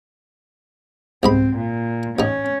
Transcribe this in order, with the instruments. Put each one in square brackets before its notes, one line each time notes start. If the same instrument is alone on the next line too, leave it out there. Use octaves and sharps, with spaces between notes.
[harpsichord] C2 G#2 B5 [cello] C4
[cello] A#2
[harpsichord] A1 D#4 [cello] C#4